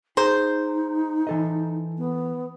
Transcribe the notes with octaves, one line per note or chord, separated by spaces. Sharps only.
D#4 G#4 C5 A#5
E3 A4 D#5
B3